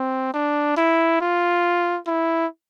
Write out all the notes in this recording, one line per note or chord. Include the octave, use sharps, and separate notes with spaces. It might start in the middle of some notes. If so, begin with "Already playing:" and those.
Already playing: C4
D4
E4
F4
E4